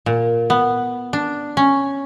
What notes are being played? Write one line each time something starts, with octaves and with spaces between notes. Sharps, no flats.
A#2
B3
D4
C#4